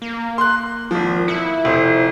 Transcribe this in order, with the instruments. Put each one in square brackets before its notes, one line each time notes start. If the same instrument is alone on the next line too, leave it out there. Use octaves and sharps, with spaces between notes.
[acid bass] A#3
[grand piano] C6 F#6
G#1 F3
[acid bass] E4 [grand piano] C#7
[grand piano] F1 C5